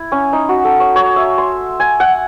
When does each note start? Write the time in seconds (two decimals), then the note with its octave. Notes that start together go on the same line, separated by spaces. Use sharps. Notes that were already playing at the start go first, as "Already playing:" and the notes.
Already playing: E4
0.12 C#4
0.33 D#4
0.49 F#4
0.65 A4
0.80 C#5
0.96 C#5
1.16 E5
1.38 C6
1.80 G#5
2.00 F#5